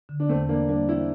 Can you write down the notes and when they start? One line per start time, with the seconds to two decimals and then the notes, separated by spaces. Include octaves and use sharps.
0.09 D3
0.20 D4
0.29 E2 A3 C4
0.49 E3 A#3 D4
0.69 G3 A#3 D4
0.88 E3 C4 E4